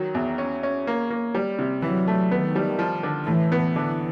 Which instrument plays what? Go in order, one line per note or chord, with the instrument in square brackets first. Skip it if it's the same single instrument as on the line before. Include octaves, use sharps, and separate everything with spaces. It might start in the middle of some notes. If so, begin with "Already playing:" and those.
Already playing: [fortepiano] D#3 F#3
E2
C#4
C#4
A#3
A#3
G3
C3
[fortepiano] E3 [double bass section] F#3
[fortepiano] A3
[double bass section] D#3 [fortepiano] B3
[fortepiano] G3
F3
D3
[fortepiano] A2 [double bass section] E3
[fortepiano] B3
[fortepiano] D3 [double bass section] E3